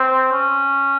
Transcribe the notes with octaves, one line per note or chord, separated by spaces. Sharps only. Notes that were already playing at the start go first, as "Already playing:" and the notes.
Already playing: C4
C#4